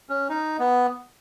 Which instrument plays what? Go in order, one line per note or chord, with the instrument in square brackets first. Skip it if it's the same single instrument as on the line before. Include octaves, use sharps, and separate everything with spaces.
[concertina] C#4
D#4
B3